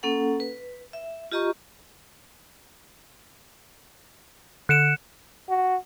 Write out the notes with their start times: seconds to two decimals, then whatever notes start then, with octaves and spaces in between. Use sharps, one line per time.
0.03 A#3 C#4 A4 F#5
0.40 B4
0.93 E5
1.32 F4 G4 D#5 A#5 C#6
4.69 D3 F#6 C#7 D7 E7
5.49 F#4